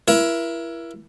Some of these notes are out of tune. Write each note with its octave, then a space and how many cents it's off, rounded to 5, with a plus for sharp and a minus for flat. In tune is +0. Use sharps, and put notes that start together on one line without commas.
E4 +25 A#4 +35